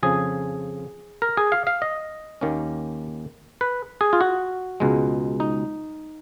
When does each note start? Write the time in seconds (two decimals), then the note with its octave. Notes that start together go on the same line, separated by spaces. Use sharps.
0.03 F2 C#3 F3 G#4
1.22 A#4
1.37 G#4
1.52 F5
1.67 F5
1.82 D#5
2.41 D#2 D#3 A#3 C#4
3.61 B4
4.01 G#4
4.13 F4
4.21 F#4
4.80 C#2 B2 G#3
5.40 D#4